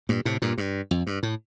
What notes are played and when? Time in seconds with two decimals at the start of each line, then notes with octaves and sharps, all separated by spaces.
0.09 G2 A#2
0.25 A2 C3
0.42 G2 A#2
0.58 G2
0.91 F2
1.07 G2
1.23 A2